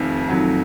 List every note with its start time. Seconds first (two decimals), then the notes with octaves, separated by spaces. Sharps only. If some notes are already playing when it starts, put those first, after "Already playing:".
Already playing: F1 F2 D#3
0.29 F1 F2 D#3 F#3